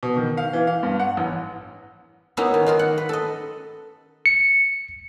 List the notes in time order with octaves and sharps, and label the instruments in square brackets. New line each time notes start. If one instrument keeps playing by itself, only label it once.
[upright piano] B2
D#3
F5
E3
F5
G2
F#5
A1
[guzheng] A#3 B3 C#4 D#4 E4 F#4
D#3
D#3 F4 A#4
F#5
B4
A4 D#5
[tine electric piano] C#7